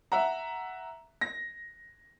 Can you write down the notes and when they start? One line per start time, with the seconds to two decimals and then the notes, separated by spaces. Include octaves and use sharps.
0.12 E5 F#5 A#5
1.21 A#6